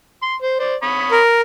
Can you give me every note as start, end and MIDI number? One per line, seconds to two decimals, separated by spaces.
0.22 0.34 84
0.42 0.59 72
0.60 0.75 72
0.60 0.75 74
0.82 1.19 73
0.82 1.19 83
0.82 1.19 87
1.11 1.41 70